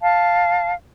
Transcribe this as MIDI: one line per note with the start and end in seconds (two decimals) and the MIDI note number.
0.02 0.72 77
0.02 0.72 81